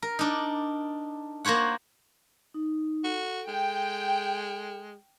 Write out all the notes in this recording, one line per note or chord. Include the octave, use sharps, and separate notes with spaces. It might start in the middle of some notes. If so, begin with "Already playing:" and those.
A#4
D4 D#4
A#3 F#4 C5 C#5 F#5
D#4
F#4 A4
G#3 G5